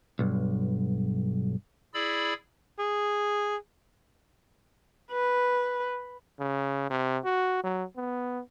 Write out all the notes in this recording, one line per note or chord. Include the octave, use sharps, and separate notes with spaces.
B1 G2
E4 G#4 D5 B5 E6
G#4
B4
C#3
C3
F#4
F#3
B3